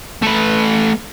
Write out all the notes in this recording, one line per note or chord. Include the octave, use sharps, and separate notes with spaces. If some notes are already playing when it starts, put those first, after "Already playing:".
A3 B4